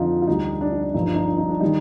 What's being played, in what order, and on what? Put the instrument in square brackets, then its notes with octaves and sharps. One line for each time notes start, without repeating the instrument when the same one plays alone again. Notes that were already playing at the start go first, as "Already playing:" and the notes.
Already playing: [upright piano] F2 D3 F3 D#4 F4
F4
D2 D3 G3 D#4
D4
D#4
D4
G1 G2 F3 D#4
D4
D#4
D4
D#4
D4
D#3 G3 D#4